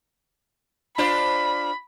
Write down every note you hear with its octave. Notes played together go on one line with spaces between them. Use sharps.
D4 F4 C5 B5